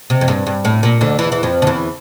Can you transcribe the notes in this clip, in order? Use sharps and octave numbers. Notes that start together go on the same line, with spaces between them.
C3
F2
G2
G2
A2
A#2
D2 D3
E2 E3
E3
F2 F3
D3
E2 E3